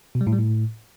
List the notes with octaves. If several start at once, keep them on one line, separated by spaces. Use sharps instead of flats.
B2
G3
A2
G3
A2